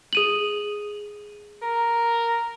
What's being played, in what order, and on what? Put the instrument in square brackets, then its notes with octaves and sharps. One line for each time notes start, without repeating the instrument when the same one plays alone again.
[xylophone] G#4 D#7 F#7
[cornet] A#4